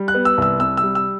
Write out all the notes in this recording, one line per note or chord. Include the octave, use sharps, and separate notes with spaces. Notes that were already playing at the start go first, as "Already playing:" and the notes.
Already playing: G3
F#6
B3
E6
C2 E6
C3 E6
E6
G3
E6